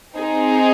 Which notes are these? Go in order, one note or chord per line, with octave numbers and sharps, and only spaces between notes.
C4 D#4 G#4